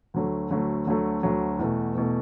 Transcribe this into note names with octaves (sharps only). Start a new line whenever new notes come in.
D2 D3 F#3 A3
D2 D3 F#3 A3
D2 D3 F#3 A3
D2 D3 F#3 A3
E2 B2 A3
E2 B2 A3